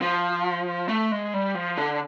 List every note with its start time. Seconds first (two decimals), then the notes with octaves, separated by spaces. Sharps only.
0.02 F3
0.88 A3
1.12 G#3
1.34 G3
1.55 F3
1.78 D3